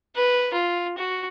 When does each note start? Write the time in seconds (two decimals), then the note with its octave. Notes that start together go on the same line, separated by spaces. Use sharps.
0.15 B4
0.53 F4
0.98 F#4